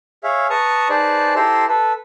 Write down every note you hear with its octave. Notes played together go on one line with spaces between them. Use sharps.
G#4 C#5 E5 F5
B4 A5 A#5 C#6 D#6
D#4 G#4 B4 C5 D5 A5
E4 G4 A4 C5 A#5 C6
A4 B4